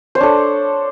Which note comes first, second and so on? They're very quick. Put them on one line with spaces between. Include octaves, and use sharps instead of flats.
C5 C#5 D4 A4